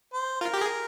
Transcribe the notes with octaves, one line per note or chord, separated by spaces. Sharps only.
C5
F4 A#4
G4
G#4